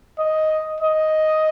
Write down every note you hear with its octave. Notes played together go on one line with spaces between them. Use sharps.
D#5
D#5